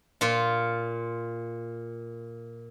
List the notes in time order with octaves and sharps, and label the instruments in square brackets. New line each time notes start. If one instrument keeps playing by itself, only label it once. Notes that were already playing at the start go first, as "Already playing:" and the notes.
[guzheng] A#2 F4